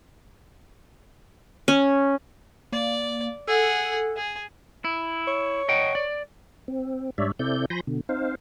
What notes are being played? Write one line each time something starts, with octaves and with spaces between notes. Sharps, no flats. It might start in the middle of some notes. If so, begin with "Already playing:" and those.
C#4
A#3 D5
G#4 A4 F#5
G#4
E4
C#5
D#5 F#5 G5
D5
C4
G#2 G3 D4 C#5 D5 E5
C3 C4 E4 A4 D5 G6
F3 G#5 B5 C6 G6 A#6
B2 D3
C4 D#4 C5 F5